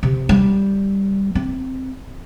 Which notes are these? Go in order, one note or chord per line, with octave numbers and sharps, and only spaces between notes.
C3
G3
C4